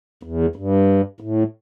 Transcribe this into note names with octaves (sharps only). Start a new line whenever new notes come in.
E2
G2
A2